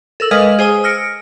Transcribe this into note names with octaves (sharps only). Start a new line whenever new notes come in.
A4 A#4 E6 F#7
G#3 B4 D#5 F5 F6 G#6
G#4 C5 G#5 D#6
E6 F6 A#6 C#7 D7